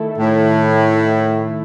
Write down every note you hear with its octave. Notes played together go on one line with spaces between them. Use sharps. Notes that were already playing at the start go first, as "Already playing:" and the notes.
Already playing: D#3 A3 E4 A4
A2 D#3 A3 E4 A4
D#3 A3 E4 A4